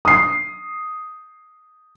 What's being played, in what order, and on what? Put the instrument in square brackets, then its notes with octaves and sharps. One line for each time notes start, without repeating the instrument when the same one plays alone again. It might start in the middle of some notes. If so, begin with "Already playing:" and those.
[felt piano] D#6 C7